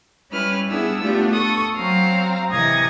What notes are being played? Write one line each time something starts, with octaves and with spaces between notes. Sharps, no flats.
G3 C#4 E4 B4 F6
G3 B3 D4 E4 G#4 E6
A3 B3 D4 F4 G4
A4 C#6 D#6
F#3 C4 F5 A#5
C3 E3 D#5 D#6 G#6 A#6